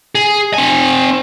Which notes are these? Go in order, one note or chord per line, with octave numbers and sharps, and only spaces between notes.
G#4
C4 G#5